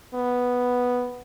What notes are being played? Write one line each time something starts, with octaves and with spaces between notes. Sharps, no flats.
B3